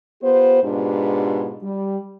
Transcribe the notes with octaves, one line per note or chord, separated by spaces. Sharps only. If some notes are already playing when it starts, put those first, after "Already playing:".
B3 F4 G4 C5
G#2 B2 B3 D4 F4 G4
G3